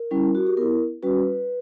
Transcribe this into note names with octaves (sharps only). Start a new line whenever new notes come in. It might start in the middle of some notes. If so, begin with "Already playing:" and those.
Already playing: A#4
G3 C#4 E4
F#4
G4
B3 E4 A#4
G3 C#4 F#4 B4